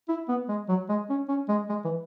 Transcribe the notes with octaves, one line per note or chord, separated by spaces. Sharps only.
E4
B3
G#3
F#3
G#3
C#4
C#4
G#3
G#3
E3